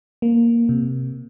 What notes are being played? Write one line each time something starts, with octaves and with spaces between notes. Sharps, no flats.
A#3
C3